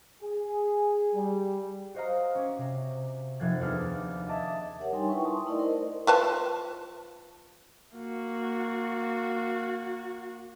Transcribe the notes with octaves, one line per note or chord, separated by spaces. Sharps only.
G#4
G3
F#4 C5 D#5 F5 A#5
C#4 D6
C3
F1 F3 F#6 G#6 A6
D#2 B3 D4 G#4 F6 A6
D#5 E5 G#5 A5 D6
G4 A#4 C#5 E5 F#5
G3 D4 D#4 G5 G#5 C6
E4 F4 B4 E5 G5 C#6
A5 C6 D#6
A3 D#4 E4 A#4 D5 D#5
A#4 C5 D#5
F3 B4 A5
A#3 F#4